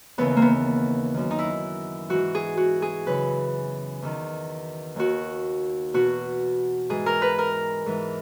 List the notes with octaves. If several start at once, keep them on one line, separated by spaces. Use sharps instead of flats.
D#2 C#3 E3 B3
A#3
B3
F#2 D#3
D#4
E4
G#2 E3 F#4
G#4
F#4
G#4
F#2 C#3 E3 B4
E2 D#3
D#2 D#3 F#4
E2 B2 F#4
G#2 E3 G#4
A#4
B4
A#4
G#2 E3